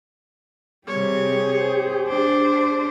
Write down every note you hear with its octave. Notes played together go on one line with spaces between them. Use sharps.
C3 G3 G4 G#4 C#5
C5
D4 C5 D6